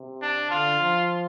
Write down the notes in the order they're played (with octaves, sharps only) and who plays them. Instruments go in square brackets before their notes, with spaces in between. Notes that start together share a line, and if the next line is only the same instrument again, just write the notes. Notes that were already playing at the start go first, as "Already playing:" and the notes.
Already playing: [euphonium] C3
[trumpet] D4
[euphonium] D3 [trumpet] F4
[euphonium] F3